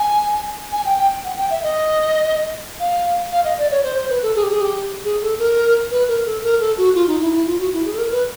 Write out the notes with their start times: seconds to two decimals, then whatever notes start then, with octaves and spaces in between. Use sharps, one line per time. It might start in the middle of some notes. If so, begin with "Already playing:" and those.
Already playing: G#5
0.72 G#5
0.85 G5
0.98 G5
1.24 F#5
1.37 G5
1.50 E5
1.63 D#5
2.80 F5
3.32 F5
3.44 D#5
3.58 D5
3.71 C#5
3.83 C5
3.96 C5
4.09 B4
4.22 A4
4.36 G#4
4.43 G4
4.51 G#4
4.61 G4
5.04 G#4
5.22 A4
5.39 A#4
5.91 B4
6.08 A#4
6.25 A4
6.43 A#4
6.60 A4
6.77 F#4
6.95 F4
7.07 D#4
7.21 E4
7.33 E4
7.46 F4
7.59 F#4
7.72 E4
7.85 G#4
7.93 A4
7.98 A#4
8.11 B4